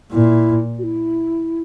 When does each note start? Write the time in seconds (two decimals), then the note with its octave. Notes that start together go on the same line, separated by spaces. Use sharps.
0.11 A#2 E4
0.79 F#4
0.84 E4